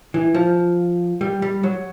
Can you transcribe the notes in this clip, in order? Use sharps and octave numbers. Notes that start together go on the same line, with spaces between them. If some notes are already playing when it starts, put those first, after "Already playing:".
E3
F3
G3
G3
F#3